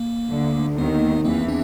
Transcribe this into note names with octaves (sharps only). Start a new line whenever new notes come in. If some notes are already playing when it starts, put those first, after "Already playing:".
Already playing: A#3
D2 D3
D#2 D#3 B3
E2 E3 A#3 C4
C4 D4